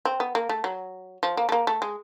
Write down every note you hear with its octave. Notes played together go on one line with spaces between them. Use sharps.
C4
B3
A#3
A3
F#3
F3
A#3
A3
A#3
A3
G#3